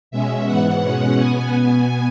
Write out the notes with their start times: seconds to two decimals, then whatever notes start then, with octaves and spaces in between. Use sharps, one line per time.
0.11 B2 G#3 C#4 E5
0.47 G#2 E3 B3 F#5
0.82 B2 G#3 C#4
1.17 B2 B3 G#5